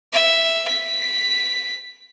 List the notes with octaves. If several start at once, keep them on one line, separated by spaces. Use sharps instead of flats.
E5
B6